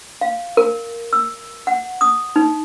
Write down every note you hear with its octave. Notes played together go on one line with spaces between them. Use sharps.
F5
A#4
E6
F#5
D#6
D#4